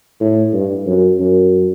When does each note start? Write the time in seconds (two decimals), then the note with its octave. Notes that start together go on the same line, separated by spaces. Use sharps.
0.21 A2
0.53 G2
0.86 F#2
1.20 F#2